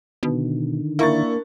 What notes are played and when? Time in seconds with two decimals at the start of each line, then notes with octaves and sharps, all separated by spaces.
0.23 B2 D3 D#3
0.99 A#3 D4 E4 A#4 C#6 A6